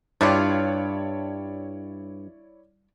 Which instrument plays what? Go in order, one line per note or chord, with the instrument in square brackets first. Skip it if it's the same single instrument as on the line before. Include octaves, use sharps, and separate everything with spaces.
[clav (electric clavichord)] G2 [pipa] G3 D4 F4 [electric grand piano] E4 C#5 D5